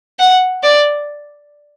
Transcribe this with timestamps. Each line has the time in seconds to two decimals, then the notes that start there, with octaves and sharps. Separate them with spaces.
0.19 F#5
0.63 D5